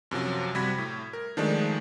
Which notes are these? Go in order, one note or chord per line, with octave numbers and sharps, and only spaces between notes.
F#2 C3 F3 F#3
C3 G3 F#4 B5 G#6 B6
A2
A#4
D#3 F3 G#3 A3 D4 D#4